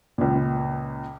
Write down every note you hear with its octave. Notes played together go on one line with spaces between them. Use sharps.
C#2 A#2